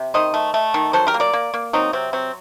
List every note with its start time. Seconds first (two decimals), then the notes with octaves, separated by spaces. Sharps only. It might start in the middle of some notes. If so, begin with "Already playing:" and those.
Already playing: C3
0.14 D#3 C5 D#5
0.34 A3
0.54 A3
0.74 D#3
0.93 F#3 A4 C5
1.07 G4 A#4
1.14 A#3
1.20 A#4 D5
1.33 A#3
1.54 A#3
1.73 F#3 C4 D#4
1.93 C3 C4
2.13 F#3 C4